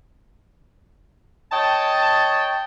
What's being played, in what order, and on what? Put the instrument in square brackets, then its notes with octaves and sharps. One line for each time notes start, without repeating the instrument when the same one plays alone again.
[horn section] C#5 D#5 G5 A5